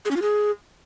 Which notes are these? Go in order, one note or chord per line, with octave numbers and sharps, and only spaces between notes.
G#4
C#4
F4
G#4